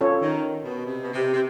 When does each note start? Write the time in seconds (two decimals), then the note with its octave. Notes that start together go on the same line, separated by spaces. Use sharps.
0.01 C#4 F4 A4 C#5
0.21 D#3
0.63 B2
0.85 C3
1.03 B2
1.12 C3
1.33 C3